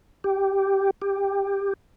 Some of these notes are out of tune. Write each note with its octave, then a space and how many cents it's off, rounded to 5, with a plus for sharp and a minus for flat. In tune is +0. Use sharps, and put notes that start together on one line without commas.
G4 -5
G4 +15